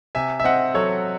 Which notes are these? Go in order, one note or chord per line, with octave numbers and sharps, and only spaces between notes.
C3 E5 G#5
E5
C4 D#5 F#5
F#3 A4 C#5